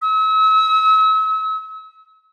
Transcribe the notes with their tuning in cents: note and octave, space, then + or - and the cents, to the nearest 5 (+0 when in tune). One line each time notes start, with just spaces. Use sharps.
E6 -40